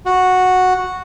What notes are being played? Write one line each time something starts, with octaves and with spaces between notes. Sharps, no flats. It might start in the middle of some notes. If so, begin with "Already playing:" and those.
F#4